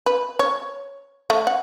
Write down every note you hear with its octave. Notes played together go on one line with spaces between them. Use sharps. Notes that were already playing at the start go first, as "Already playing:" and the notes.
B4
C#5
A3
F#5